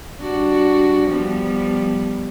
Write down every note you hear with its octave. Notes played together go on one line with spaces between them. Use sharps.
G3 D4 F#4
F3 G3 B3